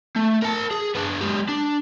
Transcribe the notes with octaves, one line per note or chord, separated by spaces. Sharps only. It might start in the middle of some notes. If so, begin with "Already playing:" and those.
A3
A#4 A5
G#4
B3 D4
G#3 G4
D4